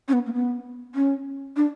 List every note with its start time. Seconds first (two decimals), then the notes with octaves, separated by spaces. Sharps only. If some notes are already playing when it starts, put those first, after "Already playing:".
0.08 C#4
0.13 B3
0.26 A#3
0.33 B3
0.95 C#4
1.56 D4